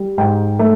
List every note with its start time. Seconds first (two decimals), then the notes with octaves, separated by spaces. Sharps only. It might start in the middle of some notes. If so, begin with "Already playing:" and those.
Already playing: G3
0.18 G#2 G5
0.59 A3